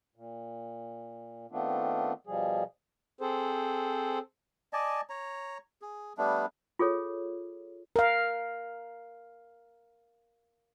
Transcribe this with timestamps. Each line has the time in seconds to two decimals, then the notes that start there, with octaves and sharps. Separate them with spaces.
0.16 A#2
1.51 D#3 A3 B3 C4 D4 F4
2.27 B2 F3 G3 G#4
3.21 C4 G#4 A4 C5
4.73 D5 D#5 G#5 A5
5.10 C#5 A#5
5.82 G#4
6.18 G3 A3 B3 D4
6.79 F4 G#4 A4 C#5
7.96 A#4 F5